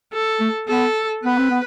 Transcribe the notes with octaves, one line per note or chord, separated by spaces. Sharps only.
A4
A3
B3 A4
B3 B4
C4
B3